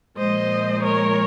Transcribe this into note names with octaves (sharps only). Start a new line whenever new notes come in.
A#2 F3 G#3 C5 D#5
A#4 C#5